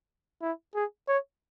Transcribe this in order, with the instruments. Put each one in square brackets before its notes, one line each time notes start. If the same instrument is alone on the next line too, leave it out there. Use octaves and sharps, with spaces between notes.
[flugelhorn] E4
G#4
C#5